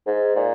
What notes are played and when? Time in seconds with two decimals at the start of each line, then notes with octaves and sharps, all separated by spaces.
0.07 G#2
0.36 A#2